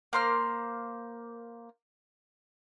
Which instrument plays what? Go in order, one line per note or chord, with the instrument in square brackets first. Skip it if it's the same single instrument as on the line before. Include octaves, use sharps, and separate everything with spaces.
[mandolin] A#3 C5 F6